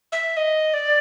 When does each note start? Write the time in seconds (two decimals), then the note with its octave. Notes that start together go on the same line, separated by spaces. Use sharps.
0.12 E5
0.37 D#5
0.74 D5